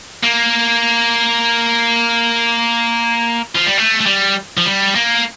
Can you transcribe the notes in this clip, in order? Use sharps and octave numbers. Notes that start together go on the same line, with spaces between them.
A#3
F3
G3
A3
A3
G3
F3
G3
A#3